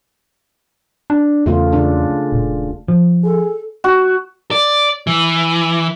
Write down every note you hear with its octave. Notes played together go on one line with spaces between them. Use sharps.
D4
E2 C#3 A3 F4
C#3 D4
D#1
F3
G#4 A4
F#4
D5
E3